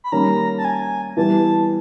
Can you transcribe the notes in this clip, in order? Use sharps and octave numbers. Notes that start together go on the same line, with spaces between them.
B5
D#3 G3 A#3 C#4 A#5
A5
G#5
E3 G3 B3 A5